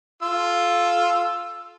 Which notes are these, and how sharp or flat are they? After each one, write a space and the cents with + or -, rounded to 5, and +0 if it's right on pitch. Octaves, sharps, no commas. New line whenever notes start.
F4 +0 A4 -30 E6 +5